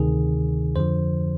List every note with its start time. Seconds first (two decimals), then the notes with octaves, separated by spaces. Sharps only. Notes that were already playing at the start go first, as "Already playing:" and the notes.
Already playing: D2 C3 D#3 G#4
0.76 F2 D3 F3 C5